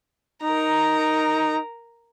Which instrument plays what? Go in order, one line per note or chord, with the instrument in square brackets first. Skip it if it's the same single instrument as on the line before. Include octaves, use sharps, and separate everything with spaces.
[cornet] D#4 [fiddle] A#4 A#5